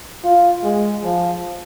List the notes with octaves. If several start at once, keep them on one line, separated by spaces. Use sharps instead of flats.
F4
G#3
F3